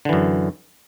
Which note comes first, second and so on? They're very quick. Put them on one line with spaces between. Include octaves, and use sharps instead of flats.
D3 E3 F#2